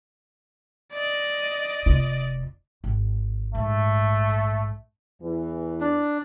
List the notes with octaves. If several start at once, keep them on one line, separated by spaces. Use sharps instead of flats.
D5 D#5
F1 F4
G#1
A#1 G#2 A3
E2 E3
D4